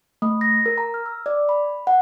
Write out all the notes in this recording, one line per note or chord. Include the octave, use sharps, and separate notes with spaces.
A3
A#6
A#4
A#5
F6
E6
D5
B5
F#5